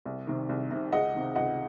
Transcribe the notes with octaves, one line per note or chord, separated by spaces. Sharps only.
C2
C3 D#3
C2
C3 D#3
C#2 D#5 F#5
C3 D#3
C#2 D#5 F#5